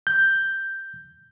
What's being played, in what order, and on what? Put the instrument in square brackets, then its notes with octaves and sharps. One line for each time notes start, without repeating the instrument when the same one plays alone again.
[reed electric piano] G6